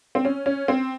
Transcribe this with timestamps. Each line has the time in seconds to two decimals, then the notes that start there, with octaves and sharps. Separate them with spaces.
0.15 C4
0.25 C#4
0.46 C#4
0.68 C4